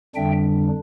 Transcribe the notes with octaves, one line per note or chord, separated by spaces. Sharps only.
F2 D3 G3 D4 E5 G5